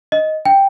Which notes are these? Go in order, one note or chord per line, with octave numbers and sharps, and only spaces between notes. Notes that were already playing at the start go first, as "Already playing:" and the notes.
D#5
G5